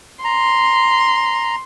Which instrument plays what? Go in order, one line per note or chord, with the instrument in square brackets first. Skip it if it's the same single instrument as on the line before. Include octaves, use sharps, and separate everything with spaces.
[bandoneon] A#5 [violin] C6